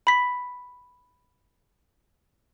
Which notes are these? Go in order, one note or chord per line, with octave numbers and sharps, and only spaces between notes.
B5 B6